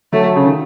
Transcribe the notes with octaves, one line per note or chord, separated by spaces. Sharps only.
F#3 A3
C#3
D#3